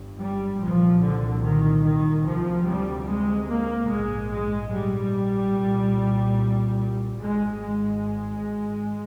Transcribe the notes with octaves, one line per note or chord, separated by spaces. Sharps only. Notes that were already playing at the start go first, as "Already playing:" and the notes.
Already playing: G1 G2
G3
C2 A#2 F3
D3
D#3
D#3
D2 C3 F3
G3
G#3
A#3
A#1 G#2 G#3
G#3
G3
C2 A#2
G#1 G#2 G#3
G#3